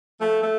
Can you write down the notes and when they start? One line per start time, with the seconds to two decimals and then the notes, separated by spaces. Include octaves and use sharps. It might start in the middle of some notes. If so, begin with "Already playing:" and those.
0.19 F3 A3
0.42 A3